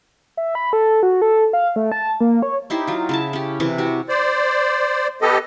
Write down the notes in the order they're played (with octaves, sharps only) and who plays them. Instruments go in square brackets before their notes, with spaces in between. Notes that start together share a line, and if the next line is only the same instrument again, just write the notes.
[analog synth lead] E5
B5
A4
F#4
A4
F5
A3
A5
A#3
C#5
[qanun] D#4 E4 G4 C5
F#3 F4
C#3 E4 A5
C#4 G4
C3 E3 B4
F#4 G4
[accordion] C5 D5
B3 G4 A4 D#5